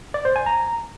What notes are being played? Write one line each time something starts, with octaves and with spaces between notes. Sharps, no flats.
D5
C5
G#5
A#5